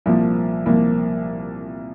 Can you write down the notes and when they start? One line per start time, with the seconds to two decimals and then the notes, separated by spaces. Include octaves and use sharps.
0.06 C2 A#2 F3 A#3
0.66 C2 A#2 F3 A#3